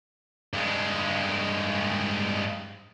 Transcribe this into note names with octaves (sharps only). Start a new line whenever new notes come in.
G2 G#3